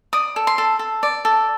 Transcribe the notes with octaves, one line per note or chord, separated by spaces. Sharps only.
D5 D#6
A4
C6
A4
A4
D5
A4